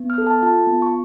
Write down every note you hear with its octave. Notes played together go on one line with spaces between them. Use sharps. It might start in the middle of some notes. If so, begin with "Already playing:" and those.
Already playing: B3
F6
A4
A5
F4 A5
B3
C#6